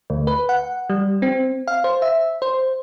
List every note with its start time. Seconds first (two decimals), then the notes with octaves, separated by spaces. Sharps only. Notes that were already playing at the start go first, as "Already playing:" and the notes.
0.10 D2
0.27 B4
0.49 F#5
0.90 G3
1.22 C4
1.67 F5
1.84 C5
2.02 E5
2.42 C5